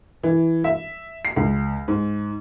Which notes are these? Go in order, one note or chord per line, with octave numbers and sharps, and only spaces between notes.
E3
E5
C7
C#2
G#2